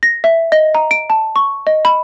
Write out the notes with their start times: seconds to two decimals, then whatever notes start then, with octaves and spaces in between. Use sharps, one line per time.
0.03 A#6
0.24 E5
0.52 D#5
0.75 A#5
0.91 D7
1.10 A5
1.36 C#6
1.67 D#5
1.85 B5